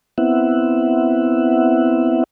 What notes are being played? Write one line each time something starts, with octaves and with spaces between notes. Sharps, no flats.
B3 C4 E4 E5 F#5